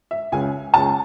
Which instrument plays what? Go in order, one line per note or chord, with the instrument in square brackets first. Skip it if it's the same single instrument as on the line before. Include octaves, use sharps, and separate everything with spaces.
[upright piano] E5
C#2 C#3 G#3 C#4 G#5
C#2 C#3 G#3 C#4 A5